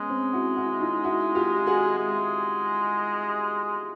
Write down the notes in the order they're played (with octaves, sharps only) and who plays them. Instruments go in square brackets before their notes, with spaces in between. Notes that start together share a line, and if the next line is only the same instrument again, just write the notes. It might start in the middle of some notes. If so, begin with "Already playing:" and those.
Already playing: [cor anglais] G#3 [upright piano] B3 C#4
[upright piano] C4
E4 F#4
E4 F#4
D#4 F4
E4 F#4
F4 G4
F#4 G#4
[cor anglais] G#3